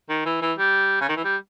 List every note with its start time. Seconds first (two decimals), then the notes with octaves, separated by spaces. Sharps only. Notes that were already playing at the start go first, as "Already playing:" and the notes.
0.09 D#3
0.25 E3
0.42 E3
0.59 G3
1.01 C#3
1.09 D#3
1.16 E3
1.25 G3